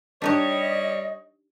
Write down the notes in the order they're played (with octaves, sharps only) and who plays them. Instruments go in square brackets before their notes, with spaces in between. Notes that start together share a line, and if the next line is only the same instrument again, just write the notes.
[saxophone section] G3 C#5 [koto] D4 D#4 G4 [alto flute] D#5